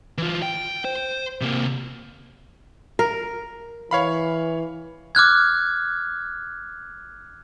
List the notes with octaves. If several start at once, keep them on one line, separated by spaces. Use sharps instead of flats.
E3 F4
G5
C5
C3 A#3
A#4
E3 C#5 F5 B5
D6 F6 F#6 G#6